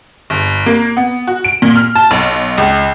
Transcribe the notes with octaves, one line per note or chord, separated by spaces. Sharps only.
G1
A#3
B3
F#4
D7
A#2
F6
A5
B1
C#2